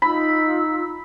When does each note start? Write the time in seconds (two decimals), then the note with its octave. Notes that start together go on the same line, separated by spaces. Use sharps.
0.02 D#4 F4 B5 E6